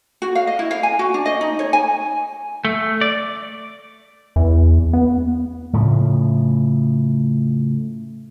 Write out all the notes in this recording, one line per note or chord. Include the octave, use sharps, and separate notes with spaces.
F#4
F5
D#5
E4
F5
G#5
F#4
D4
D#5
D#4
C#5
G#5
A3
D5
E2
B3
A2 C#3 F3